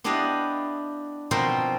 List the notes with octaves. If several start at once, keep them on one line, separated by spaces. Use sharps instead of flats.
B3 D4 E4 G4 D#5 F5
B2 F3 C4 A#4 C5